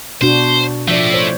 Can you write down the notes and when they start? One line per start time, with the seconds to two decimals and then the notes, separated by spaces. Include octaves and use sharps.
0.22 B2 D4 F#4 C5
0.88 F3 A3 E4 D5
1.14 C5 C#5